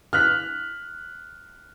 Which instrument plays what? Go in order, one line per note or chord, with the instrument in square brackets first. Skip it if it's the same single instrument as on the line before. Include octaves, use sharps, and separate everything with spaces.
[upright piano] F6 F#6 B6